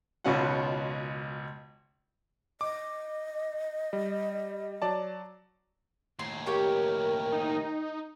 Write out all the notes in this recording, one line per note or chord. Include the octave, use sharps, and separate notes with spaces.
G#1 C#2 B2 C#4 F4 F#5
D#5 D6
G3
F#3 D5 A5
D#2 A2 C6
G4 A#4 C#5 G5
D#4